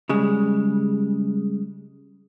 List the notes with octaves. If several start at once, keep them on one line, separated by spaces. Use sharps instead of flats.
C#3 G3 G#3